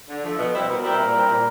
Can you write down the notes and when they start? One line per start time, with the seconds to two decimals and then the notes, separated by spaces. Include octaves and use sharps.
0.09 D3
0.24 F3 A3
0.38 B2
0.54 G3 C4 E4
0.68 B2 A#4
0.83 G3 C4 E4
0.99 A#2
1.14 G3 C4 E4
1.29 A#2